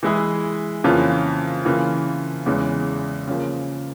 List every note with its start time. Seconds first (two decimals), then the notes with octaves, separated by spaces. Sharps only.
0.03 E3 G#3 E4 G#4
0.84 F2 C#3 E3 A#3 F4
1.65 C#3 E3 A#3 F4
2.46 E2 C#3 E3 G#3
3.27 C#3 F3 A#3